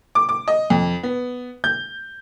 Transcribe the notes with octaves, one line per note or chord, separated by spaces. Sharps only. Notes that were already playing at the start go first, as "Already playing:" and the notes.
D6
D6
D#5
F2
B3
G6